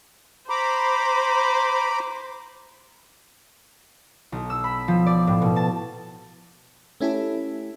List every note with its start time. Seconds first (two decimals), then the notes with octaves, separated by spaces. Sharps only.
0.49 C5 A#5 B5 D6
4.32 B1
4.50 E6
4.64 B5
4.88 F3
5.06 D5
5.27 A2
5.42 B2
5.56 A5
7.01 A3 C#4 E4 G4 A4